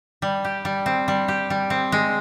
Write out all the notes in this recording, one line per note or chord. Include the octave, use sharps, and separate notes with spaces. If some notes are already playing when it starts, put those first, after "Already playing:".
G3
G4
G3
C4
G3
G4
G3
C4
G#3